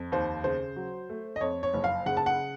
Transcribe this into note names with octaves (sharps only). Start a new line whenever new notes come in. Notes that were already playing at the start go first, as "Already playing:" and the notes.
Already playing: F2
D#2 C5
C#3 C5
F#3
A3
D#5
F2 C#5
C#5
F#1
F5
C#3 F#5
A5
F#5